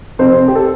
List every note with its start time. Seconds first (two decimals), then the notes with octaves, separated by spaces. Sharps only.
0.19 F2 C3 C5
0.48 G4
0.55 A4